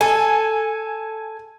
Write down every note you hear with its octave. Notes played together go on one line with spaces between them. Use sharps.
A4 G#5